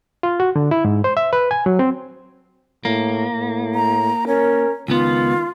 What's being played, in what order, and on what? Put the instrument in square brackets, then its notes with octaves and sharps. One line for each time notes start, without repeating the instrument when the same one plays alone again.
[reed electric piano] F4
F#4
D3
E4
G#2
C5
E5
B4
G#5
F#3
C4
[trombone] A2 [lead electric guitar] A#3
[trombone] A2
[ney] A#5
[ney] C#4 [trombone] A#4
[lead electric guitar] C#2 B3 [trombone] D#3 [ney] F4